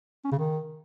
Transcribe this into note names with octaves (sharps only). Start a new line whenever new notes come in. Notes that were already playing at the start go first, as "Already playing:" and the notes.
C#4
C#3
D#3